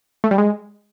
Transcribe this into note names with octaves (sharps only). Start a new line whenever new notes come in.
A3
G3
G#3